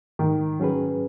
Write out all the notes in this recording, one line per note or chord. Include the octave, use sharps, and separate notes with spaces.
G#2 D#3
F#3 C#4 G#4 B4